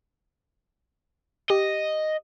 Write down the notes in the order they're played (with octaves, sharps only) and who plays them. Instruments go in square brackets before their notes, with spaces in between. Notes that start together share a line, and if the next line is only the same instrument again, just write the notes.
[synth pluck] G4 [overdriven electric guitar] D#5